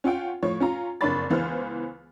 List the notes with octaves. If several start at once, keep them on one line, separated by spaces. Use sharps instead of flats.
C#4 F4 F#5 G5
A2 F3 C#5
C#4 F4 A#5
F#1 F2 D4 C#5 B5 A6
C#2 E3 B3 C5 F6